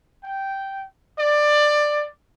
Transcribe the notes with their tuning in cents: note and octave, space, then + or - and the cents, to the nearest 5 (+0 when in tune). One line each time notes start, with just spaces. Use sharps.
G5 -10
D5 +15